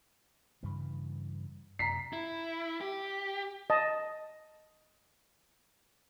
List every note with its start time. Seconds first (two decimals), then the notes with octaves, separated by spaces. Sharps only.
0.63 G2 C#3 E3
1.79 F#2 C3 A#5 B6 C7
2.13 E4
2.81 G4
3.70 D#5 A5